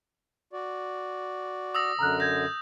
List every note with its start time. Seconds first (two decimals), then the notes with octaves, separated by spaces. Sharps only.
0.53 F#4 D5
1.75 D#6 E6 A#6
1.99 F#2 D3 A#5 F6 F#6
2.20 G6 G#6 A#6